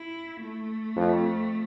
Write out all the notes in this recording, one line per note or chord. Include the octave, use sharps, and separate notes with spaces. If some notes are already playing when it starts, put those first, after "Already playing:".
Already playing: E4
A3
F2